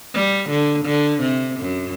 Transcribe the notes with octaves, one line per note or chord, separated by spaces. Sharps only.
G3
D3
D3
C3
F#2